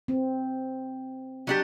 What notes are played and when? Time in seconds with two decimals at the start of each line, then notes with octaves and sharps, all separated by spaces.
0.08 C4
1.47 F#3 D4 G4